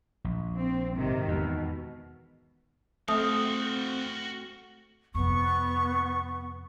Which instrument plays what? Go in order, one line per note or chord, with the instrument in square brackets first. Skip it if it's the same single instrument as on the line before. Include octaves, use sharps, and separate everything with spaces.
[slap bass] A#1
[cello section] C4
G#2 C3 D#3
[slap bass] E2 [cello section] B2
[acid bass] A3 [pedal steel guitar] C4 [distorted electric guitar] F#4 F5 [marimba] D#6
[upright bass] F2 C3 [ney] B3 [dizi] C#6